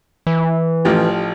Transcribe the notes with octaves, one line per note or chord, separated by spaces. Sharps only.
E3
A1 F3 G4